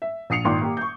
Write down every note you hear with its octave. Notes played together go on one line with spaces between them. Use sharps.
E5
A#1 D#6 C7 C#7 F7
G#1 A#2 D#3 C6 D6
A#3 G4
C#6 G6